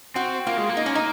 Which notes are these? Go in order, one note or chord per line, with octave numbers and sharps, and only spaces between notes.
C4 F#4
A#3 F4
G#3
A#3
D#4
C#4
D#4